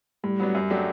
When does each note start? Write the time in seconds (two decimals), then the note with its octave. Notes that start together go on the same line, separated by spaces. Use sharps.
0.24 A2 G3
0.40 F#3 B3 D4
0.55 F#2
0.70 F#3 A3 D4 G4